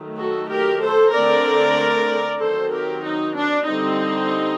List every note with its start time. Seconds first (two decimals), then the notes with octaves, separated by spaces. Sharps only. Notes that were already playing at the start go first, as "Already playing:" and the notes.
Already playing: D#3 F#3 A3
0.17 F#4 A4
0.49 G4 A#4
0.81 A4 C5
1.13 D3 A3 C4 A#4 D5
2.40 D#3 F#3 C4 A4 C5
2.72 G4 A#4
3.03 D#4
3.35 D4
3.67 D3 G3 C4 D#4